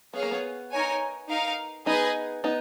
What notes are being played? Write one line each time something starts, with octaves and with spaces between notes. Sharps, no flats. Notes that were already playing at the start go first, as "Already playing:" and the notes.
B3 G#4 C#5 F5
A#3
B3
D#4 A#4 C#5 G#5
D#4 A#4 F5
B3 D#4 G#4 B4 D#5 G#5
B3 D#4